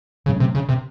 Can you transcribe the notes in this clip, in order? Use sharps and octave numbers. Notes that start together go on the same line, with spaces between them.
A#2 C#3 F#3 A3 C#4
C3
C#3
C3